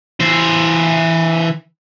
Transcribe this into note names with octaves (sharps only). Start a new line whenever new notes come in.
E3 C5